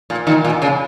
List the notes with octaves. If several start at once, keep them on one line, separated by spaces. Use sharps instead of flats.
A#2
A#2 D#3
A#2
C#3